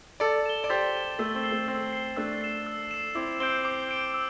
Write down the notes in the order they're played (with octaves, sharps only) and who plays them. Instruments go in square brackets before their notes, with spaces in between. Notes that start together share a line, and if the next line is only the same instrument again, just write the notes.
[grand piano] A4 D5 [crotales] A6
[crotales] E7 G7
[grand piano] D5
[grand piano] G4 C5 [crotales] A6
[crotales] E7 G7
[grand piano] A3 [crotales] E6
[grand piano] C4
[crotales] C7 G7
[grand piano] A3
[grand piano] C4 [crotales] E6
[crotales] C7 G7
[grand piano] A3 D4 [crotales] E6
[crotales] C7 E7
E6
C7 E7
[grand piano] C4 E4 [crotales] D6
[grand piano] C4 [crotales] G6 D7 G7
[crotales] D6
G6 D7 G7
E6